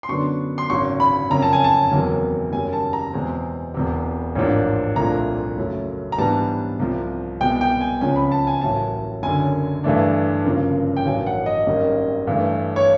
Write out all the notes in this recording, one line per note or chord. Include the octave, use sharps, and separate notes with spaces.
C6
F#2 D3 F#3 B3 D4 C#6
C6
G#1 F#2 C#3 F#3 C#6
B5
F#1 F2 C#3 A#5
A5
G#5
A5
F#1 E2 C3 D#3 F#3
F#1 F#2 D#3 G3 G#5
A5
A#5
E2 B2 G#3 C4
E1 E2 C3
A1 G#2 F3 A#3 D4
C2 A#2 F3 A3 D4 A#5
F#1 F#2 C#3 F#3 A3
A#5
G#2 E3 G3 B3 D4 A5
C2 C3 F3
C2 B2 G#3 G5
G5
G#5
C#2 C#3 F3 G#3 C#4 G#5
B5
A5
G#5
A1 A2 F#3 A#3 A5
F#1 F#2 D3 G#5
G2 E3 A3 D4
G1 F#2 C#3 F3 A#3
G5
A1 G2 D#3 F#3 G#5
F#5
D#5
G#1 F#2 D#3 G3 A#3
G2 E3 A3
C#5